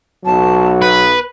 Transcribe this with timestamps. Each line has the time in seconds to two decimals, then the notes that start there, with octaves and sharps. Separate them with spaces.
0.25 B1 F#3 A5
0.82 B3 B4